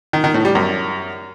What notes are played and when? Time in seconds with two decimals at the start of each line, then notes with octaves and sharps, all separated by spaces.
0.13 D#3
0.24 D#3
0.34 A2
0.45 G3
0.55 F#2